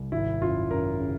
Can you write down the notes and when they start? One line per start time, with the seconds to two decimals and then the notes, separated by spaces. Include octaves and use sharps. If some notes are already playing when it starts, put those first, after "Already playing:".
Already playing: C2
0.12 G#1 E4
0.41 F#2 F4
0.71 F#2 A#4
0.99 C#3